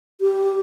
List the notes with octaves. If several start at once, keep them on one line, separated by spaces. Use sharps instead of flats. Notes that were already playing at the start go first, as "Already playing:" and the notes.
G4